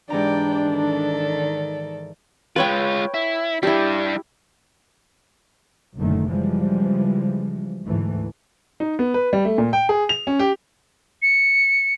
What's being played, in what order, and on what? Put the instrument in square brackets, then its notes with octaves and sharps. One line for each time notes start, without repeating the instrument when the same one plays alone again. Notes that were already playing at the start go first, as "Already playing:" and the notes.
[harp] G#2 E3 A#5 [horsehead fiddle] D4 [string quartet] G4 D5 G5
[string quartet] D#3 A4 D5
[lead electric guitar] G#3 F4 [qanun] B4 C#5 G5
[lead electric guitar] E4
[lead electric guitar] G3 D4 [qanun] E4 G4
[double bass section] F#1 F#2 A#2 D3 D#3 A3
C#3 E3 F3 G3 G#3
D2 G#2 E3 A3
[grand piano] D#4
B3
B4
G3
A3
A#2
G5
G#4
F7
C#4
G4
[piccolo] C#7